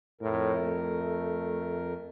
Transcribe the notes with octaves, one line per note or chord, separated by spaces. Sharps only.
F2 A2 A#4
A3